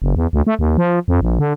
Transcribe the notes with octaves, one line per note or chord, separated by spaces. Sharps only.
F#1
E2
D2
A3
D#2
F3
F2
A#1
D3